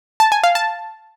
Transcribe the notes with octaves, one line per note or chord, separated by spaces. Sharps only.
A5
G#5
F5
A5